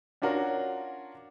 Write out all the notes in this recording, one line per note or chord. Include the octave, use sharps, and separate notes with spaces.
C#4 D4 F4 F#4 A#4